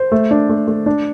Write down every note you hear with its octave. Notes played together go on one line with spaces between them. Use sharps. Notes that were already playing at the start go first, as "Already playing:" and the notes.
Already playing: C5
A3
D4
A3
A3
D4